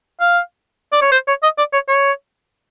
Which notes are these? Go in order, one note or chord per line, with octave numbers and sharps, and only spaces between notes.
F5
D5
C#5
C5
C#5
D#5
D5
C#5
C#5